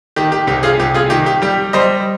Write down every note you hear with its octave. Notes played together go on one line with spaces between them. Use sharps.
D#3 G4
G4
C2 G4
F4 G#4
C2 G4
F4 G#4
D#3 G4
G4
G3 G4
G3 C5 D#5